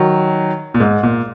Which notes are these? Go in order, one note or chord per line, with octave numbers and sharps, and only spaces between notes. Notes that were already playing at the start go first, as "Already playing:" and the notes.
Already playing: D#3 F#3
A#2
G#2
A#2